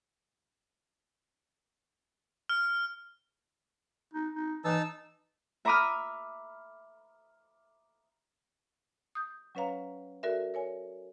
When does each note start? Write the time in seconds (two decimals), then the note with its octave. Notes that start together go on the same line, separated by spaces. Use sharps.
2.49 F6
4.13 D#4
4.35 D#4
4.65 E3 D#4 A5 E6
5.65 E5 A#5 B5 D6 D#6 F6
9.15 D#6 G6
9.55 F#3 C#4 B4 C#5 F5 A#5
10.23 F#4 A4 A#4 D5 E5
10.54 A#4 C#5 G#5